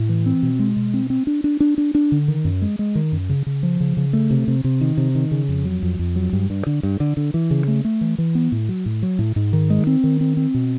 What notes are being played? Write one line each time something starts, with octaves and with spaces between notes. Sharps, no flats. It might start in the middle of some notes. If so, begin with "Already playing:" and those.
Already playing: A2
E3
C4
B2
G#3
B2
C4
C4
D4
D4
D4
D4
D4
D3
D#3
F#2
G#3
G#3
D#3
F#2
C#3
C#3
F3
C#3
C#3
A3
C3
C3
C3
D#3
C3
D#3
C#3
F2
F#3
F2
F2
F#3
G2
G2
D3
G2
D3
D3
E3
C#3
A3
A3
E3
E3
B3
A2
F#3
A2
F#3
A2
G#2
D#3
G#3
C4
D#3
C4
C4
B2